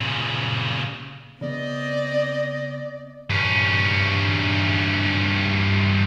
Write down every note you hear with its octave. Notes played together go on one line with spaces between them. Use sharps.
A#2 C#3
C#3 B3 C4 D5 D#5
G2 C#4